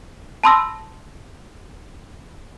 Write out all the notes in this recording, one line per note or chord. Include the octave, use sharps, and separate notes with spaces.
A5 B5 C6 D#6 E6 A#6